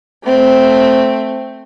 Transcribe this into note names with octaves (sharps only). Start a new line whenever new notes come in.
A3 C4